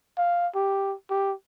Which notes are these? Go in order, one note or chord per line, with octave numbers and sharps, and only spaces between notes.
F5
G4
G4